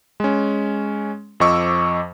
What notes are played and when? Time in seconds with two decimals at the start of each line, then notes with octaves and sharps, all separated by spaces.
0.20 G#3 C#4
1.40 F2 F3 D#5 C#6 D6 E6